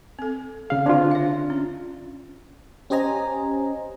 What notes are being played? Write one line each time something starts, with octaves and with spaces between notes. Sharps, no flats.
C4 A4
C#3 G#4 F5
D3 C4 D4 F4 C6
C#5 E5
C#4
C#4 G4 C5 D#5 G#5 A#5